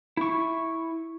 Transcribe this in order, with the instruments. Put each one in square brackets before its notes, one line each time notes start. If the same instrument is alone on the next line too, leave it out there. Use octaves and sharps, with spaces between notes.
[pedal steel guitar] E4 C#6